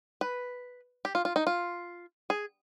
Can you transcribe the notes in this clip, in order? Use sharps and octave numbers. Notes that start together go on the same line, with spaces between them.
B4
G4
F4
F4
D#4
F4
G#4